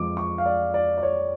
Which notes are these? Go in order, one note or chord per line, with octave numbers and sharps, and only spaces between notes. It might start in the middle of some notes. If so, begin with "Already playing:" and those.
Already playing: F2 F3 G#3 D6
C#6
F5
D5
D5
D5
C#5